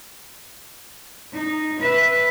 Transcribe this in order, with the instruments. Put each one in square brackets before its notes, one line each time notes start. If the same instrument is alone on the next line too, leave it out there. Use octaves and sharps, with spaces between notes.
[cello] D#4
B4 E5